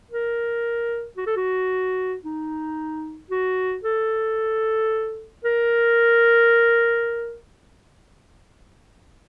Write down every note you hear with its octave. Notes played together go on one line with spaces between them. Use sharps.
A#4
F#4
A4
F#4
D#4
F#4
A4
A#4